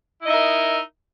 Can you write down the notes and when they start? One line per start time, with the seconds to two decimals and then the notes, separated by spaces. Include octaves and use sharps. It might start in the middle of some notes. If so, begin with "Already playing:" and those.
0.22 E4
0.25 D#5
0.28 D#4
0.31 E5
0.34 A#4